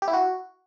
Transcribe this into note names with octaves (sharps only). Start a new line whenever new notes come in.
G4
E4
F#4